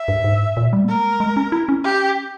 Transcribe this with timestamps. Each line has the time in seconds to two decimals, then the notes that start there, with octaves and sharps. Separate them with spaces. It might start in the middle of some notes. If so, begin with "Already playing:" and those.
Already playing: E5
0.08 G2
0.24 G#2
0.57 A#2
0.73 G3
0.84 A#3
0.89 G#3 A#4
1.20 G#3
1.37 C#4
1.52 E4
1.69 C#4
1.84 G4